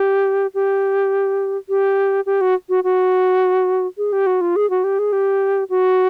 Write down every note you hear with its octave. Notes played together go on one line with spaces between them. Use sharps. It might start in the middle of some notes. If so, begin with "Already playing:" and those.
Already playing: G4
G4
G4
G4
F#4
F#4
F#4
G#4
G4
F#4
F4
G#4
F#4
G4
G#4
G4
F#4